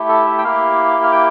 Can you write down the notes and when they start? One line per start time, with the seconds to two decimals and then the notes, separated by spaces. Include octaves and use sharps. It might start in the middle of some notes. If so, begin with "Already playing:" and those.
Already playing: A3 E4 G4
0.09 A4
0.27 E5
0.38 G5
0.44 A#3 E4 G4 F5
1.03 F5
1.12 G5